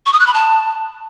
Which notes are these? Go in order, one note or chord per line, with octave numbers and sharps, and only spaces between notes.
C#6
D#6
F#6
B5
A5